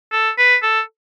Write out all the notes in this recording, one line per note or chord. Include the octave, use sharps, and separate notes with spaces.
A4
B4
A4